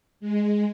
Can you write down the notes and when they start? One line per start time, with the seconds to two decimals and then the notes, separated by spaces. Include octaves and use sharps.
0.20 G#3